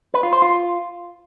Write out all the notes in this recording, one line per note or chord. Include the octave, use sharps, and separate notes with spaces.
B4
F4
C5
F4